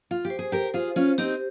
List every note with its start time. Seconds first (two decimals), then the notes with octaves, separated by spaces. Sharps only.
0.11 F4
0.25 G4
0.30 C5
0.39 G#4
0.52 G4 A#4
0.74 F4 G#4 C5
0.96 C#4 F4
1.18 C4 D#4 G4